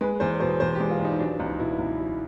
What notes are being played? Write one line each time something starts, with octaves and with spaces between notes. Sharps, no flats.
G#3 B4
E2 C5
B2 C5
E2 C5
G4
G#3
F4
E2
D#4
F#3 D4
C#2 D#4
B2 E4
C#2
F#3